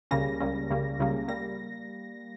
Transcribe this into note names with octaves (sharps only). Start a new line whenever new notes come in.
C#2 C#3 G3 A#3 C#4 A#6
C#2 C#3 G3 A#3 C#4
C#2 C#3 G3 A#3 C#4
C#2 C#3 G3 A#3 C#4
G3 A#3 A#6